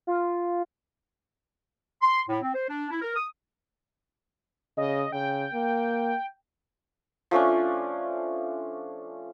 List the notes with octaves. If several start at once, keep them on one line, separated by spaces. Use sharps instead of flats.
F4
C6
A2
C4
C5
D4
E4
A#4
D#6
C#3 D#5
C#3 G5
A#3
F3 A3 C#4 D4